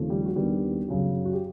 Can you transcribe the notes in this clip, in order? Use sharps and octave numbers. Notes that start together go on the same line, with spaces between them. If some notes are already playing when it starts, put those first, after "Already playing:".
Already playing: D#2 C#3 F3 A3 C4
G3 G4
F#4
D#2 D#3 G3 B3 D4 G4
F#2 C#3 F#3
F#4
G4